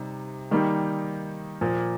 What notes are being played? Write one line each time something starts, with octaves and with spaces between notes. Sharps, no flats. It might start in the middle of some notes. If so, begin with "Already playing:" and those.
Already playing: C3 G3 D#4
D#3 G3 A#3 D#4
A#2 F3 A#3